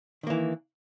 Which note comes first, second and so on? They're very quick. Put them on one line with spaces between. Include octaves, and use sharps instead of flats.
D#3 A#3 E3